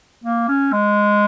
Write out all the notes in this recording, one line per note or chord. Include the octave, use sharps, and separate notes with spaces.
A#3
C#4
G#3